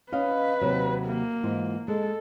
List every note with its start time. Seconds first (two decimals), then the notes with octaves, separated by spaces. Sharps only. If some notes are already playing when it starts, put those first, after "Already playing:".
0.12 C#4 B4 D#5 F5
0.61 D#2 C3 F#3
1.05 A#3
1.43 G#2 E3 F4
1.88 G#3 A4